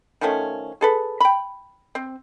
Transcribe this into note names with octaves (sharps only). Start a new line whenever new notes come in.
D#3 F3 A3 C#4
G#4 A4 B4
G5 B5
C4